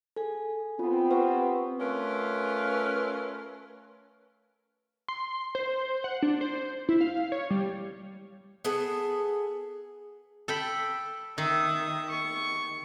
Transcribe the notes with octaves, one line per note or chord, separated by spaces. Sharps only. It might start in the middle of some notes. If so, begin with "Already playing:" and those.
G#4 A4 G#5
B3 C4 F4
F4 G4 B4 F#5 C#6
A3 C#4 F4 A#4 B4
C6
C5
F#5
D4
C5
E4
F5
C#5
G3
B3 G#4 A4
A4 G5 B5
D#3 E5 D#6
C#6